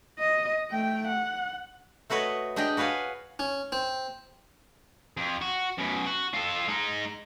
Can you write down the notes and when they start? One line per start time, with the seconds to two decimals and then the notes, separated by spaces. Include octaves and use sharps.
0.19 D#5
0.71 A3 G5
1.08 F#5
2.10 A3 F#4 B4 C#5 D#5
2.56 G#3 D4 G4 D5 D#5 G5
2.77 F#4 B4 C#5 F5 G#5
3.39 C#4
3.72 C4
5.17 F2
5.42 F#4
5.78 F#2 B2
6.06 F#4
6.34 F4 A4
6.68 G#3 D#4